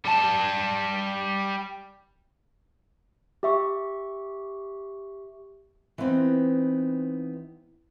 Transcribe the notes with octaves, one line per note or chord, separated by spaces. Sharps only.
G3 A5
G4 E5 C#6
E3 B3 C4 D#4